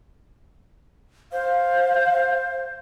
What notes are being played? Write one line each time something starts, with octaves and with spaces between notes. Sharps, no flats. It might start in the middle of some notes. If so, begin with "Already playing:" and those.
C5 F5